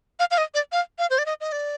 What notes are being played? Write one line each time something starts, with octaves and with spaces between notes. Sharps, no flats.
F5
F5
D#5
D5
F5
F5
C5
D5
D#5
D#5
D5